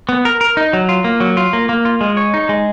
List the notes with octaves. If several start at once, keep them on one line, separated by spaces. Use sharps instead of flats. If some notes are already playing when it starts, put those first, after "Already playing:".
B3
A#4
A#4
D#4
F#3
F4
A#3
F#3
F4
A#3
A#3
F4
G#3
C#5
D#4
G#3